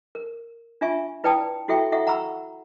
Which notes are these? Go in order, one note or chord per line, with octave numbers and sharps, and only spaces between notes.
A#4
D4 F4 E5 G#5 C#6
E4 B4 D5 G5 A5 D#6
E4 F#4 A4 E5 G5 C#6
E4 A4 E5 F#5 C#6
F#5 A#5 B5 C#6 E6